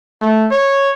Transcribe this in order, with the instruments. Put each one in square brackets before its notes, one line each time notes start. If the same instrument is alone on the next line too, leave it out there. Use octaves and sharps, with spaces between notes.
[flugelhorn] A3
C#5